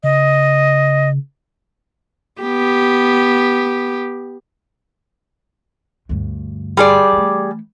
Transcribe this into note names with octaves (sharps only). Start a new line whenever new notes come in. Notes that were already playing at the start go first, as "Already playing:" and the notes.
C#3 D#5
B3 G4
D2 G2
G3 G#4 D5
E3 A3